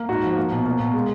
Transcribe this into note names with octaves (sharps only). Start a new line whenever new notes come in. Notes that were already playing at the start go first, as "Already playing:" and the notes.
Already playing: A#3
G#2 F#4
F3
A#3
B2
A#3
B2
G#3